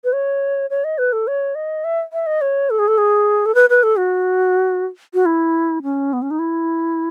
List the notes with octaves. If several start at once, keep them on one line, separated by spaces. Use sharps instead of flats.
B4
C#5
C#5
D#5
B4
A4
C#5
D#5
E5
E5
D#5
C#5
A4
G#4
A4
G#4
A4
B4
B4
A4
F#4
F#4
E4
C#4
B3
C#4
D#4
E4